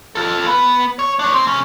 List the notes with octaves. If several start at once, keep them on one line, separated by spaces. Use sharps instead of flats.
F4 A4
B3
C#5
D4 C#5
C4
C2 C#4